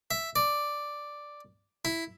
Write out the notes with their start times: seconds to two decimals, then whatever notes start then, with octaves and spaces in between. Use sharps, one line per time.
0.11 E5
0.36 D5
1.85 E4